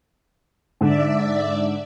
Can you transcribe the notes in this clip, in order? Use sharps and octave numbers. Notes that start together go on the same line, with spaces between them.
G#2 D3 D5 E5